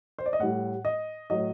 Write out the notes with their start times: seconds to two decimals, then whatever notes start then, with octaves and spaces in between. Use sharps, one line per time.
0.18 C5
0.26 D5
0.33 D#5
0.40 A2 G3 F#5
0.85 D#5
1.30 A2 F#3 D#5